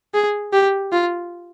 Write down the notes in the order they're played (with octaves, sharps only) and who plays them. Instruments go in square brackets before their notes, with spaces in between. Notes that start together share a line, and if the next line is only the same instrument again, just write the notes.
[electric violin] G#4
G4
F4